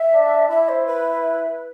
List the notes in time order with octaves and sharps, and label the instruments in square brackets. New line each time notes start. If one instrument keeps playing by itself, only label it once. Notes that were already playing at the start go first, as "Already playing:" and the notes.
Already playing: [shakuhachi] E5
[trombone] D4
[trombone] E4 [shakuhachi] E5
[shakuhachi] C5
B4